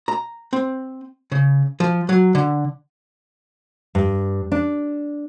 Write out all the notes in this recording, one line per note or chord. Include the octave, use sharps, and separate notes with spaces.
A#5
C4
C#3
F3
F#3
D3
G2
D4